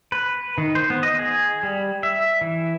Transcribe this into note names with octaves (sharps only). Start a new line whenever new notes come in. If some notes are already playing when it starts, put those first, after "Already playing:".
B4
D#3
C5
B3
D#5
G#4
G3
E5
E3